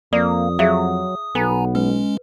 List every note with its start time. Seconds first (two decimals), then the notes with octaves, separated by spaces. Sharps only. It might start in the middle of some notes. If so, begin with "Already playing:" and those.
0.13 F2 A#3 D5 D#6
0.59 F#3 G#4 E5 F5
1.35 B1 B3 A4 G#5 A#5
1.75 G#3 C#4 B4